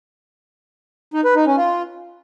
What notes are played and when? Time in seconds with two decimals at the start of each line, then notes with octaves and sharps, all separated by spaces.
1.14 D#4
1.25 B4
1.35 D#4
1.46 C#4
1.57 F4